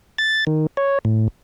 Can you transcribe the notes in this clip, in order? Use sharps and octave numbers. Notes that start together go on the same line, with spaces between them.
A6
D#3
C#5
A2